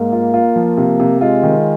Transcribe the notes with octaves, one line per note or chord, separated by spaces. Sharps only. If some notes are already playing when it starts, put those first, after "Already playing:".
Already playing: G#2 A#3
F4
F4
F3
C3
C3
G#3 F4
D#3